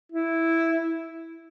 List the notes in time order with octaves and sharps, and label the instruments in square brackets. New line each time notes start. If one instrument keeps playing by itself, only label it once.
[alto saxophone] E4